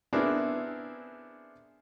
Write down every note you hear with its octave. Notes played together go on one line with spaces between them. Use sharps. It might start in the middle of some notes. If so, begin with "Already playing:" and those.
B3 C4 D4 E4 G#4 A#4